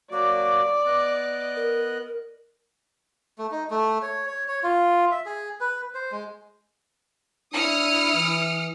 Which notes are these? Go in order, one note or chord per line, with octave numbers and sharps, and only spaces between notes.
F#3 A#3 F#4 D5 D6
B3 D#5 F#6
A#4
A3
D#4
A3
C#5
C#5
C#5
F4
E5
G#4
B4
C5
G#3
D4 E4 D#6 F6 C#7
E3